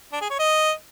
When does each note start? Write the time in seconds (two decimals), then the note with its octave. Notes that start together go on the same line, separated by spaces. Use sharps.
0.13 D4
0.22 G#4
0.30 C#5
0.39 D#5